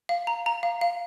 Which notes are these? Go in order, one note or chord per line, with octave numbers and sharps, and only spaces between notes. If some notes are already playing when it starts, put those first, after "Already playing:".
F5
A#5
A#5
F5
F5